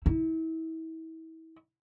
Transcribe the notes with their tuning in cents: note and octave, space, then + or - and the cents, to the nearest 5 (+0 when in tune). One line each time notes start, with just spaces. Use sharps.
E4 -35